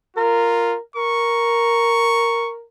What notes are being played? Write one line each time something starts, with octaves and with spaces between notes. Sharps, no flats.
F4 A#4
A#4 C#6